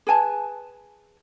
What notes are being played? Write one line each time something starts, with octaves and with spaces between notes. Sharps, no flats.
G#4 B4 G#5 A5